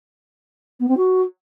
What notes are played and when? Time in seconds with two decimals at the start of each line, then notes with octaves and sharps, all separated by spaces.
0.80 B3
0.89 C4
0.97 F#4